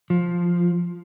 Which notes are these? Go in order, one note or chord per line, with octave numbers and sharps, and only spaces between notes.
F3